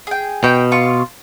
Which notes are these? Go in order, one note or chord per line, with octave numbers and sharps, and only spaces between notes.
G#4 G5
B2 G5
F4 C#6